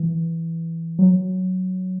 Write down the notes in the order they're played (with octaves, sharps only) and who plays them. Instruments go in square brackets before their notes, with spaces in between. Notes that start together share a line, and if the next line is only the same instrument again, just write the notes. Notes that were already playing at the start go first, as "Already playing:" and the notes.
Already playing: [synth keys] E3
F#3